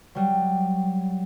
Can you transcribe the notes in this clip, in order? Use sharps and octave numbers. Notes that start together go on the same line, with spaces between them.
F#3 G3